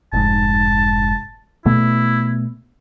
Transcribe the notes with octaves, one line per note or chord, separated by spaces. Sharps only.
F1 G#2 A5
B2 A3 B3 E4